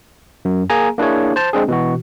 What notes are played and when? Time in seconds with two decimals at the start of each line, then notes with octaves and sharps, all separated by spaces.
0.45 F#2
0.70 A#3 G#4 G#5 A#5
0.98 A#3 D4 E4 G#4 C#5
1.36 C5 A5
1.53 G#3 C4 D4 G#4
1.68 B2 E3 F#4